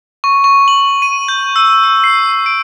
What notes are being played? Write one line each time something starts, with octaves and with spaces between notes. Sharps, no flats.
C#6
C#6
F#7
D#7
G6
E6
E6
C7
C7
D7